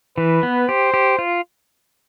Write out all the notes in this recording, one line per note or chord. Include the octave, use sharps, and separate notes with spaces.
E3 B4
B3
G4 C5
G4
F4